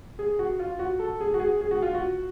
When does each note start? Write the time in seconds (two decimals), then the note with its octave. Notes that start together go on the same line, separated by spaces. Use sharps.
0.19 G#4
0.39 F#4
0.59 F4
0.79 F#4
0.99 A4
1.21 G#4
1.34 F#4
1.40 G#4
1.61 G#4
1.71 F#4
1.82 F4
1.95 F#4